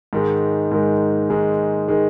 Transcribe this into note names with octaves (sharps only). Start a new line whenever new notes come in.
G#2 D#3 G#3
G#2 D#3 G#3
G#2 D#3 G#3
D#3 G#3